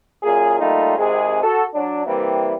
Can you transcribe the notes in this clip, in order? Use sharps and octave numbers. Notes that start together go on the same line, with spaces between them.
F#2 A#2 G#4
G3 A3 A#3 D#4 F4
G#1 C3 G#3 G#4
F#4 A4
F#3 D4
E3 G3 A#3 C4 E4